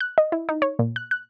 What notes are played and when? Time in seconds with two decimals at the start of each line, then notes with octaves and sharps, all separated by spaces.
0.01 F#6
0.18 D#5
0.32 E4
0.49 D#4
0.62 C#5
0.79 A#2
0.96 F#6
1.11 F#6